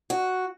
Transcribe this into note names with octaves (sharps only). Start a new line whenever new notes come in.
F#4